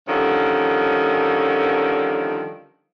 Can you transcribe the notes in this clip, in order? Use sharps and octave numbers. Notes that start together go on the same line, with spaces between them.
D3 D#3 F3 G3 A#3 C#4